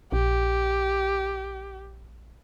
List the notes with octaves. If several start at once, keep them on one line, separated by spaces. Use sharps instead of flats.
A#1 G4